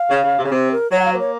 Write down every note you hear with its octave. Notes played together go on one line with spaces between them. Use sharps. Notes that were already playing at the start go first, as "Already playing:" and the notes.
Already playing: F5
C#3
C#3
C3
C#3
C3 C5
A#4
F#3 C#5
F#5
F5
A#3 C5
C#5